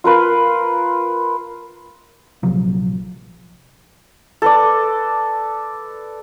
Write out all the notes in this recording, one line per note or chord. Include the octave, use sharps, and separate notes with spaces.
F4 A#4 B4 C6
A#1 C3 F3 F#3
A4 B4 D5